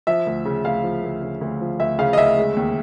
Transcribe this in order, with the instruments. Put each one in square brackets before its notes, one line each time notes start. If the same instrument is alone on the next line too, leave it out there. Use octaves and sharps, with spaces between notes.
[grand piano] F3 E5
D2
C#3
D2 F5
F3
D2
C#3
D2
F3
D2 E5
C#3 F5
D#5
D2 E5
G#3
D#2